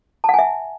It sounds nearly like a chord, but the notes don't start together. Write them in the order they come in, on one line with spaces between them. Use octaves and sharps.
A5 F#5 G#5 E5